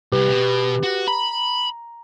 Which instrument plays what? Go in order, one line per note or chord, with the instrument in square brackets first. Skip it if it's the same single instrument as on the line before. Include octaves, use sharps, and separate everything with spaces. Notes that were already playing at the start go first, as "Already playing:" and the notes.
[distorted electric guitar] C2 [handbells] G4 B4
[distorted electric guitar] B2
F#4
[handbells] A#5 [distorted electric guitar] B5